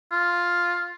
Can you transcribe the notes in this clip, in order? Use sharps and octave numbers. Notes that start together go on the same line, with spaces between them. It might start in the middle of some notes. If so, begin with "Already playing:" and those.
F4